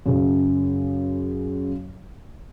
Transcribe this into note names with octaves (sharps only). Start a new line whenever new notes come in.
F#2 C#3